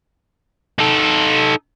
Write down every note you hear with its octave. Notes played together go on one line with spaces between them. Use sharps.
D#4 A4